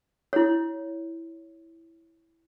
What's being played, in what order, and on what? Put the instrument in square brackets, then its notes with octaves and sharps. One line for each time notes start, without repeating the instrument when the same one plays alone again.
[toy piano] E4 C#5